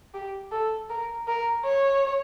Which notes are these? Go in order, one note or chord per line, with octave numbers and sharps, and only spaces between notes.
G4
A4
A#4
A#4
C#5